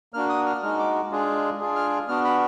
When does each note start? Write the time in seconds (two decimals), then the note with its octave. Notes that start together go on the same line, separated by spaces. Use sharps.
0.14 A#3 D4 F#4 F6
0.29 D#6
0.46 F6
0.62 G#3 D#4 F#4 F6
0.79 D6
1.12 G#3 D4 F4 G#4
1.60 D4 F4 G#4
1.76 F6
2.08 B3 D4 F#4 F6
2.25 B5